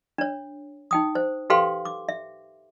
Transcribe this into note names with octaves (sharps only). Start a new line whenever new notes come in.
D4 C#5
D#4 G5 D#6
C5
G4 A4 B4 F5 G5 C6
D6
E5